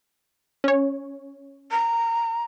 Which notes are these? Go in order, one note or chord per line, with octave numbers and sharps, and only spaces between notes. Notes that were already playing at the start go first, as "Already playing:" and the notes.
C#4 C#5
A#5